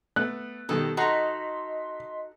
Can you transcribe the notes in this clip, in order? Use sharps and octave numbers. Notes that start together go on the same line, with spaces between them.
A3 B3 F#6
B2 D#3 G3 A4
D#4 F#4 A4 D#5 A#5 C6 B6